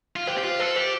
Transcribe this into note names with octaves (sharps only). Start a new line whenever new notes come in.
F4
G4 C5
G4
F4 C5
A4 C5
G4 C5